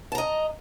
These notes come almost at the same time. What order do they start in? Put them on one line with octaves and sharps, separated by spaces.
A5 A#5 D#5